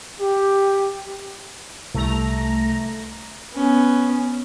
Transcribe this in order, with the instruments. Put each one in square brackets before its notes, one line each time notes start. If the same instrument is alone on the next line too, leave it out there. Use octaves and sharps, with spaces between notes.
[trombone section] G4
[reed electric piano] C2 [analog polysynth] A3 A#5
[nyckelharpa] B3 C#4